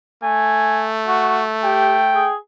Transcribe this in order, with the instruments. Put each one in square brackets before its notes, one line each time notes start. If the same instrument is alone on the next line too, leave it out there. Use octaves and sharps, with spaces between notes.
[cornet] A3 [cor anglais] G#5
[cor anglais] F#4
[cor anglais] G4 [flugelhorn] G5
[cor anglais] G#4